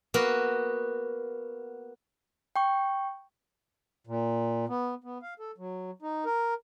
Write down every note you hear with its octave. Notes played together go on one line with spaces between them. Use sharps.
A#3 B3 F#4 A#4
G5 C#6
A#2
B3
B3
F5
A4
F#3
D#4
A#4